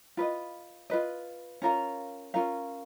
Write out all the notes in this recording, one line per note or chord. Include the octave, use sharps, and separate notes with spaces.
F4 B4 D#5
F4 B4 D#5
C#4 F4 A#4 F5
C#4 F4 A#4 F5